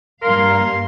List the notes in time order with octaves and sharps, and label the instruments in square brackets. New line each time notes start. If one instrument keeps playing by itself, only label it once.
[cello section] G2 A#3 F5 [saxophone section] A#4 [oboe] C6